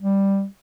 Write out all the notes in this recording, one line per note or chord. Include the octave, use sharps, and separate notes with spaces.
G3